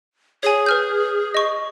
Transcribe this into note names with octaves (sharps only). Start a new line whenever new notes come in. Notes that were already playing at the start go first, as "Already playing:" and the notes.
G#4 C#5 G#5
B4 F6 G6
D#5 C#6